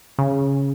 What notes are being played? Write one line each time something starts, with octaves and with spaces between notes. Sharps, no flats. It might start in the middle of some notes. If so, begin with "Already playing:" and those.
C#3